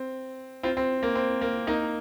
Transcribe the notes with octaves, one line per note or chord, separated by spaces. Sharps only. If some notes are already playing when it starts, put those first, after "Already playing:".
Already playing: C4
C4 F4
C4
A#3
C4
A#3
A#3 D#4